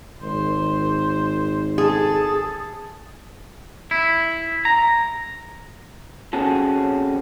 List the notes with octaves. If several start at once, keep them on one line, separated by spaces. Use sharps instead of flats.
G#1 C5
G#4 A4 A5
E4
A#5
C4 C#4 F#4 G#4 A4